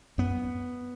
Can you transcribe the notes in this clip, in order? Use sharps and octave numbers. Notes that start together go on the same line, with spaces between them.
F#2 B3